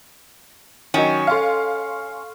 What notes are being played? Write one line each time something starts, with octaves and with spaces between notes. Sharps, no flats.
D#3 F#3 C#4 D#5 F#5 G5
A4 F5 C6 C#6 F6